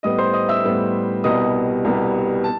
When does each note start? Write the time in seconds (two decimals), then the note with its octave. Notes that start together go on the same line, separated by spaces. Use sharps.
0.03 A2 G3 B3 D#5 D#6
0.18 C5 C6
0.33 D#5 D#6
0.49 E5 E6
0.64 A2 G3 B3
1.24 C2 B2 G3 B3 D#5 D#6
1.85 C2 B2 G3 B3
2.44 A5